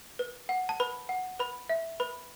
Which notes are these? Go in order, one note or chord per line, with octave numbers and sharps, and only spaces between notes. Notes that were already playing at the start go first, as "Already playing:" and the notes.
B4
F#5
A5
B4 B5
F#5
B4 B5
E5
B4 B5